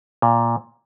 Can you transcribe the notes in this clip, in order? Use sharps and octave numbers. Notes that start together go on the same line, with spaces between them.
A#2